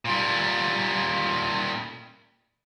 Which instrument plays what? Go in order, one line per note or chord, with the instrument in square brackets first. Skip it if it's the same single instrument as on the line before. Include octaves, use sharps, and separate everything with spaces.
[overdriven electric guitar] A#2 G3